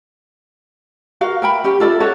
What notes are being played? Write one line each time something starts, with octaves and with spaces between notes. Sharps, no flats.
F#4 A#4 F5
A#4 E5 G5 B5
C#4 G4 G5
F4 A4 D5 E5
C#4 F#4 A4 C#5